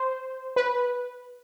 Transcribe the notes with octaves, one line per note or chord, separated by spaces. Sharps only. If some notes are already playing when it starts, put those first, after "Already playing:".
Already playing: C5
B4